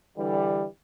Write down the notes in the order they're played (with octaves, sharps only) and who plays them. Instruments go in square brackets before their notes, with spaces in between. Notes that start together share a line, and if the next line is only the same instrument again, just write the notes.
[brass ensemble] D3 E3 G3